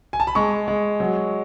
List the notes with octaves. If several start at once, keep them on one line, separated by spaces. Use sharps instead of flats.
G#5
A5
B5
G#3 C#6
G#3
F#3